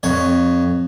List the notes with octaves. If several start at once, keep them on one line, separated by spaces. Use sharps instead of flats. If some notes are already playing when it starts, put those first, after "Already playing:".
F2 C#5